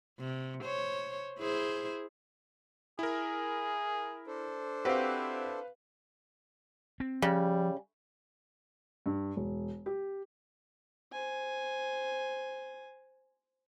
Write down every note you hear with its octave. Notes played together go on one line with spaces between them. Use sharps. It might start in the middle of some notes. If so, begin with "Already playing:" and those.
C3
C5 C#5
E4 G#4 C5
E4 G#4 A#4
D4 A4 C5
C4 E4 F#4 G4 B4 F5
C4
C#3 F3 G3
G2
E1
G4
C5 G#5